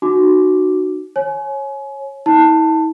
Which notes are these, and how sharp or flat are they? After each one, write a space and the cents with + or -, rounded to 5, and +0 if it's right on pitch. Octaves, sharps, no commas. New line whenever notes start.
D#4 -45 F#4 +0 D6 +0
C#5 -20 G#5 +30
E4 -45 A5 +15